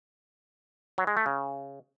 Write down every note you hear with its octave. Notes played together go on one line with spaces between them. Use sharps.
F#3
G#3
A3
C#3